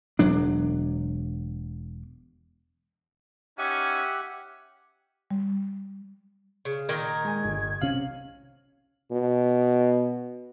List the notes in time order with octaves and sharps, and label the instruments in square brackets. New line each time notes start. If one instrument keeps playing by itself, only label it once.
[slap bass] E1 F#3 D4
[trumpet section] C#4 D#4 G#5 [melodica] G4 E5 F#5
[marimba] G3
[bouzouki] C#3
[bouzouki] A#2 D#3 A#4 [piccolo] G#6
[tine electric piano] G#3 G#5
G1
[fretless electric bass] B1 C3 C#4 [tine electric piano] F5 [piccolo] F#7
[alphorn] B2